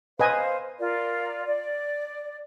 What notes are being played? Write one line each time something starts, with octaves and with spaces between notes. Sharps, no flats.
B4 C5 D#5 F5 G#5
F4 A#4 D5
D5